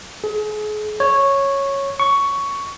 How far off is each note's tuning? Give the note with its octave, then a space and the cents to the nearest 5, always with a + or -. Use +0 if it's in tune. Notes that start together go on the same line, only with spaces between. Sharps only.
G#4 +35
C#5 -5
C#6 +10